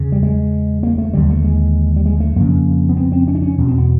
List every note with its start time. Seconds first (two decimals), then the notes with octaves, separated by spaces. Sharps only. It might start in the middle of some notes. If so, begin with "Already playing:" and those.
Already playing: E2 C#3
0.12 G3
0.23 G#3
0.83 A#3
0.98 A3
1.13 D#2 D3 G3
1.30 A3
1.44 G#3
1.96 G3
2.06 G#3
2.20 A3
2.36 F2 C#3 A#3
2.89 B3
2.96 C4
3.12 C4
3.28 C#4
3.35 D4
3.42 C#4
3.58 E2 B2
3.68 C4
3.78 B3